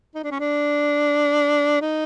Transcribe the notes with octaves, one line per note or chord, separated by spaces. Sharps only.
D#4
D4
C#4
D4
D#4